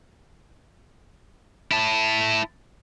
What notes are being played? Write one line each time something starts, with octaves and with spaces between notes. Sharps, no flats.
E4 A5